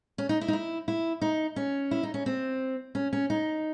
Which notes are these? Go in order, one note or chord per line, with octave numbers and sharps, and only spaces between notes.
C#4
D#4
E4
D#4
E4
E4
D#4
C#4
E4
D#4
C#4
C4
C#4
C#4
D#4